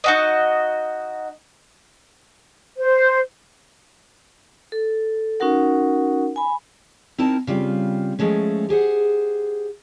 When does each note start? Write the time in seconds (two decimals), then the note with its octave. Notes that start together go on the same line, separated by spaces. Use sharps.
0.04 D#4 F#4 D#5
2.77 C5
4.72 A4
5.40 C#4 D#4 F#4 A#4 F#5
6.36 G#5 B5
7.18 C4 D#4 E4 A#4 A5
7.47 C#3 G3 C4 F4
8.19 F3 G#3 A3 C#4
8.69 G4 G#4 C5 F#5